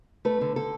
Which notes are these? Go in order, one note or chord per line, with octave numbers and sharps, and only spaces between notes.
A3 B4
D3
D3 A4